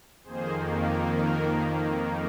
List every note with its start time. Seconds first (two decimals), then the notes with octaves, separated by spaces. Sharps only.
0.24 F2 D#3 A#3 G#4 C5
1.12 A#4